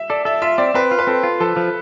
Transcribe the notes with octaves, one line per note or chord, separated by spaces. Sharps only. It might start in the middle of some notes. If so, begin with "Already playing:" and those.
Already playing: E5
A4 D5
A4 E5
F4 E5
C4 D5
C4 B4
F4
B4
C4 A4
F4
F3 A4
F3